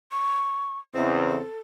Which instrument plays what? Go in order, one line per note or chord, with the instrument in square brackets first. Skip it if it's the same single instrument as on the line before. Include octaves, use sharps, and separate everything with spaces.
[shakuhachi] C#6
[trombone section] E2 C#3 [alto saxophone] C4 [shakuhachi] D#5
[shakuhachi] A4